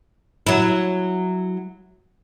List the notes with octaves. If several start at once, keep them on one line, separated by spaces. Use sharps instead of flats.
F#3 E4